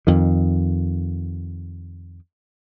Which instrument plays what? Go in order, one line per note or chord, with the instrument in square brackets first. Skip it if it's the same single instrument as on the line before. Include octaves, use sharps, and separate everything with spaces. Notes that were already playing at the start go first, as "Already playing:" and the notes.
[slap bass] F2 D#3